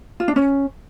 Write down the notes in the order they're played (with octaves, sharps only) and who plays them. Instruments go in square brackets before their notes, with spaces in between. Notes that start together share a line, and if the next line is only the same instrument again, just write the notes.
[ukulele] F4
D4
C#4